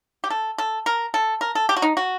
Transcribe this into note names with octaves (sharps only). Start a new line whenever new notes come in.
G4
A4
A4
A#4
A4
A#4
A4
G4
F#4
D#4
F#4